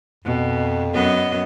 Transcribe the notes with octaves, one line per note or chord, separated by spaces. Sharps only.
F2 B2
F#2 B3 D#5